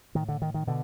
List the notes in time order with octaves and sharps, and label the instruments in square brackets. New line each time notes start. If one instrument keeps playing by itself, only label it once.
[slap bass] A2 D#3
D3
D#3
D#3
B2 D3